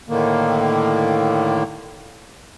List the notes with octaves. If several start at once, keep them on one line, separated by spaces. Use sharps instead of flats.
A2 D3 D#3 A#3